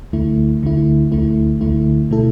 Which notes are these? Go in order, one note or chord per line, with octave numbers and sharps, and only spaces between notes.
D2 D3 A3 E4
D2 D3 A3 E4
D2 D3 A3 E4
D2 D3 A3 E4
B2 A3 E4 A4